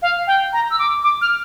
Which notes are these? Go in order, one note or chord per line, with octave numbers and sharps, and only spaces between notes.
F5
G5
A#5
E6
D6
D6
F6